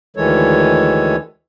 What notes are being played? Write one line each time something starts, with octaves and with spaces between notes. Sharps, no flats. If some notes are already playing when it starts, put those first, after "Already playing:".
D2 D#3 E3 G#3 A4 C#5